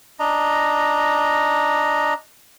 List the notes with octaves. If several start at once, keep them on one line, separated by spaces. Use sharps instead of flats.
D4 D#5 A#5